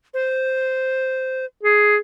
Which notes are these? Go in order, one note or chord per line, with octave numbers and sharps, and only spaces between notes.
C5
G#4